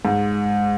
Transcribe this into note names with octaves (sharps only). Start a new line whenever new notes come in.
G#2